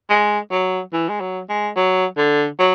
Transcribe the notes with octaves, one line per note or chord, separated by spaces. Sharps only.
G#3
F#3
E3
G#3
F#3
G#3
F#3
D3
F#3